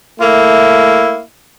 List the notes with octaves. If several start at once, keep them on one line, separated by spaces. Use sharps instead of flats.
A3 A#3 E4